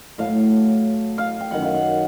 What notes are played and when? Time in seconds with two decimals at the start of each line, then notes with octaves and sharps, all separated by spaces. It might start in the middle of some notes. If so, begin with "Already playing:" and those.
0.18 A2 F#3 A3 F5
1.18 F5
1.40 G5
1.51 F#2 D#3 F#3 F#5
1.62 F5
1.74 F#5